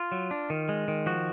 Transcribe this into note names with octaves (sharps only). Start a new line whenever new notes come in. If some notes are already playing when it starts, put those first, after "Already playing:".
Already playing: F4
F#3
D4
D#3
G#3
D#3
F3 F#4